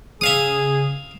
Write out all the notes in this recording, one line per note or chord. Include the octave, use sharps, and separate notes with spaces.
C#3 G#4 E5 F5 D#6